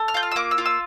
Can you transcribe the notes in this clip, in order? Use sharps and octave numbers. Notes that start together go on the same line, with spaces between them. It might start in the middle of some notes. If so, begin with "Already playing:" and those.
Already playing: A4
F6
F4 G6
F6
E6
A#3 D6
E6
F4
E6